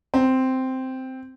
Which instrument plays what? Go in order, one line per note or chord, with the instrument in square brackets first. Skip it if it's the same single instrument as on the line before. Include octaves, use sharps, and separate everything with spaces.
[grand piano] C4